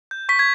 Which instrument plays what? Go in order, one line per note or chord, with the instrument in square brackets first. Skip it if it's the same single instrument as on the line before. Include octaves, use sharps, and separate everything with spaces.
[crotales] G6
C#6 B6
G#6